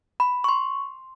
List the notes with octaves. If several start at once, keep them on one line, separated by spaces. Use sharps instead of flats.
B5
C#6
C6